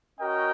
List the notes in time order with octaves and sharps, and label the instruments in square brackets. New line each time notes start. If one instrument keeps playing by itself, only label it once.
[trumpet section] C#4 F#4 A#4 D#5 G5